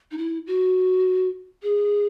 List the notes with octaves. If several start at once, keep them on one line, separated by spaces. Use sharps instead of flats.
D#4
E4
F#4
G#4